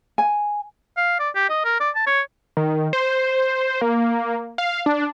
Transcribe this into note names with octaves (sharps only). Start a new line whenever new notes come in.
G#5
F5
D5
G4
D#5
A#4
D5
A5
C#5
D#3
C5
A#3
F5
D4